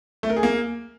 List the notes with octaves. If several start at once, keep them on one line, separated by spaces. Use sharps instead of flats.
A3
A#4
G#4
A#3